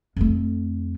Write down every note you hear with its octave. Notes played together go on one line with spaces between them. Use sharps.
F2 A3